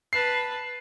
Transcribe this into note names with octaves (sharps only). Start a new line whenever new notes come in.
B4 A5 C7